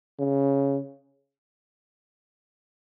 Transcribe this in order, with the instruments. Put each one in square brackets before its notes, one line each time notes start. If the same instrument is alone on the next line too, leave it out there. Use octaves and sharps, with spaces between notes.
[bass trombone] C#3